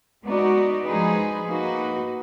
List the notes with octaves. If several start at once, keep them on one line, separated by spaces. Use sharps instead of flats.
G#3 B3 D#4 F#4 D5
F3 G#3 D#4 G#4 B4
A#3 D#4 F#4 B4